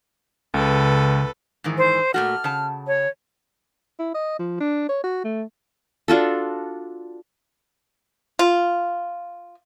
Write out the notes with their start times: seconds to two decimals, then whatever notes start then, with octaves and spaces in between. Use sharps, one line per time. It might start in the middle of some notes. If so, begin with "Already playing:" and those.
0.54 C#2 C#3 A4 B4
1.64 G#2 D#3 E3
1.78 C5
2.14 A#2 A3 F#4 F6
2.44 C#3 A5
2.87 C#5
3.99 E4
4.14 D#5
4.39 F3
4.60 D4
4.89 C#5
5.04 F#4
5.24 A3
6.08 D4 F4 F#4 A4
8.39 F4